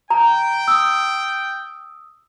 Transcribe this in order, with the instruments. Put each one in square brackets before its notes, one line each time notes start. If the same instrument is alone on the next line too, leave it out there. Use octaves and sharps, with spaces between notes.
[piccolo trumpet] G5 [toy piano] A#5
[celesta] D#6 E6